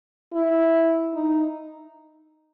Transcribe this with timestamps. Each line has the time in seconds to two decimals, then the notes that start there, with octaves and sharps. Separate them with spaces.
0.34 E4
1.14 D#4